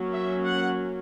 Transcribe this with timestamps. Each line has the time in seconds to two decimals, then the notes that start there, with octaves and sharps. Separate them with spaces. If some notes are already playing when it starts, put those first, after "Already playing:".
Already playing: F#3 A#3 C#4
0.14 E5
0.44 F#5